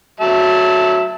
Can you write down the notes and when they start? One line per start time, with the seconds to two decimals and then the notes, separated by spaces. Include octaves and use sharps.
0.20 F#3 E5 A5